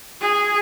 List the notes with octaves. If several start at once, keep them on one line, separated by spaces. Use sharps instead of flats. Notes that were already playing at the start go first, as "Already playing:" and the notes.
G#4